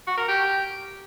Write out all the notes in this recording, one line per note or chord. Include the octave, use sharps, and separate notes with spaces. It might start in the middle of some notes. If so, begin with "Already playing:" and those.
F#4
A#4
G4